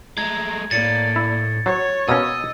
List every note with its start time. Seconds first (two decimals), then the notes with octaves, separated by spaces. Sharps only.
0.18 G#3 A3 A#5 G#6
0.71 A2 A#3 D5 A6 C#7
1.16 E4
1.66 F#3 C#5
2.09 B2 A#3 C#4 D#5 E6